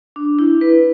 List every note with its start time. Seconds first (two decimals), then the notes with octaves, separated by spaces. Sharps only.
0.16 D4
0.39 E4
0.61 B4